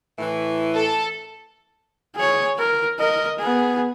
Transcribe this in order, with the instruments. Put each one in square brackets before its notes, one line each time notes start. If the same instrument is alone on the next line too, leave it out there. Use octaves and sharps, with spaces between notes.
[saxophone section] A2 E3
[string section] A4
[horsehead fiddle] G#4 C#5
A#4
A#4 D#5
B3 G#4